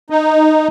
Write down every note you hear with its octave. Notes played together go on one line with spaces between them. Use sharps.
D#4